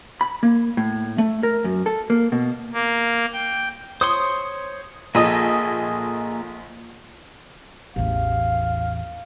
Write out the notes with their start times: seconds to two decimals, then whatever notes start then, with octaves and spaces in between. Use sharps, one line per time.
0.21 B5
0.43 A#3
0.77 A2
1.18 A3
1.43 A#4
1.64 F#2
1.86 A4
2.10 A#3
2.32 B2
2.73 A#3
3.33 G5
4.01 C5 C#5 C6 D#6
5.15 A#1 A#3 G#4 A4 D#5
7.96 A1 E2 F5